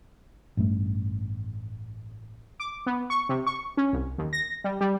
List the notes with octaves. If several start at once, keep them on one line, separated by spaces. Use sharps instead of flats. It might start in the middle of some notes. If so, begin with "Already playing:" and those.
A1 G2 G3 A3
D6
B3
C#6
C3
C#6
C#4
C2
D#2
A#6
G3
G3